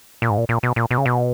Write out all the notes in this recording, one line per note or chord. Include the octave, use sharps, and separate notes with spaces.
A#2
G#2
A#2
A#2
B2
A#2
B2
C#3
B2